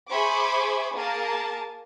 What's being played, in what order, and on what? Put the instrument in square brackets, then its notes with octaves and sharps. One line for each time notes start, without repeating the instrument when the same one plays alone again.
[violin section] G#4 C5 E5 B5 C#6 D6
A#3 G#4 A#4 A5